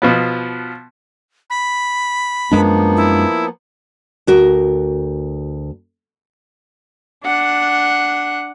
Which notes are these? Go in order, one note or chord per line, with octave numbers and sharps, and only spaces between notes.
B2 F3 B3
B5
F#2 F3 G#3 A#3 B3 D4
E4
D2 F#4 A#4
D4 F#5